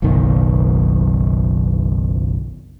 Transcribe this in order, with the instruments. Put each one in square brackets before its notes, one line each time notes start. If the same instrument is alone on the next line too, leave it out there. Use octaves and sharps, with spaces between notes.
[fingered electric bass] F#1 B1 B2 D#3